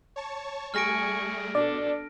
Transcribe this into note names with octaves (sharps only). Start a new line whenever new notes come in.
C#5 A5 C#6
G3 A3 G#4 G#5 C#6 F6 A#6 D7
B2 D4 A4 D5